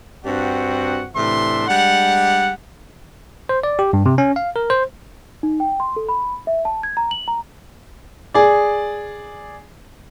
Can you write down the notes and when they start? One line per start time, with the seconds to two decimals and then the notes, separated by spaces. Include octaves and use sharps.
0.25 G2 C4 D4 F#4 F#5
1.15 A2 C3 E3 D4 E5 C6
1.67 G3 G#3 D4 F#5
3.49 C5
3.63 D5
3.79 G4
3.93 G2
4.06 C3
4.18 C#4
4.36 F5
4.56 A#4
4.70 C5
5.43 D#4
5.60 G5
5.80 C6
5.96 A4
6.09 B5
6.47 E5
6.65 A5
6.83 G#6
6.97 A#5
7.11 F#7
7.28 A#5
8.34 G#4 D5